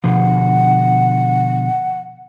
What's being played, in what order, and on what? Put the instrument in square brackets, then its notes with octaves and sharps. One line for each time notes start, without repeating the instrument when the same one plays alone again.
[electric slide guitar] B2 D3 F3 [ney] F#5